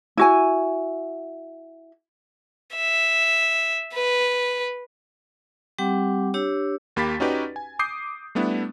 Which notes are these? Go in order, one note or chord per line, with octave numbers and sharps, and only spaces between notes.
E4 F#4 G#5
E5
B4
G3 C4 G4 F#5 G5 D6
D4 G4 C#5 E6
D#2 A#3 G4 B5 A6 B6
C#4 D#4 F#4 G4 B4 D5
G#5
D6 D#6 G6 C7
G3 A3 B3 D4 E4